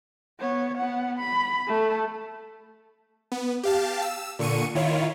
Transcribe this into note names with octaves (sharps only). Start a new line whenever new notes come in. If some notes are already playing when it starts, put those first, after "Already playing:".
B3 C#5
B3 F#5
B5
A3 A4
B3
G4 F5 A5
E6
A#2 D3 C#6 C#7 D#7
D#3 E4 F4 C#5